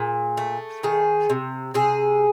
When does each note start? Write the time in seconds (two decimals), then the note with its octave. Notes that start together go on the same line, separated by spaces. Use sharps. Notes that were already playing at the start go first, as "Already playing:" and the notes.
Already playing: A#2 G#4
0.37 A3
0.83 D#3 G#4
1.30 C3
1.74 C3 G#4